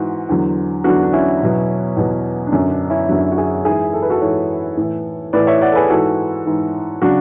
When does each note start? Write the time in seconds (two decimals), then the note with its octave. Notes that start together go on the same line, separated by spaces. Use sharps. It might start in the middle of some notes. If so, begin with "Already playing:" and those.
Already playing: G#2 E3 F#4
0.29 E2 D3 F#3
0.84 E2 D3 F#3 D4 F#4
1.03 D4
1.13 C#4 E4
1.41 E2 B2 F#3
1.97 E2 B2 F#3
2.47 D4
2.52 F#2 D3 F#3 C#4
2.71 D4
2.90 C#4 E4
3.09 F#2 D3 F#3 D4 F#4
3.32 F#4
3.37 E4 G#4
3.65 G#2 E3 E4 G#4
3.93 A4
4.02 B4
4.10 F#4 A4
4.21 G#2 E3 A4 C#5
4.77 A2 E3
5.33 A2 E3 B4 D5
5.47 C#5 E5
5.61 D5 F#5
5.72 A4
5.75 G#4 B4
5.89 G#2 E3 F#4 A4
6.46 G#2 E3
7.02 C#3 F#3 D4 F#4